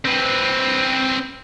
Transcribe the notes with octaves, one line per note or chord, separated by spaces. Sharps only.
C4 B4